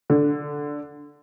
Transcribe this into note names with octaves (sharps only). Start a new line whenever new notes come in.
D3